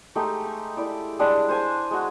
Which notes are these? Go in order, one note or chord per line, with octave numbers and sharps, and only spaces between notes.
G#3 A3 D#4 G4
C#6
E4 D5
G3 G#3 D4
C5 G#5 A5
G#3 F#4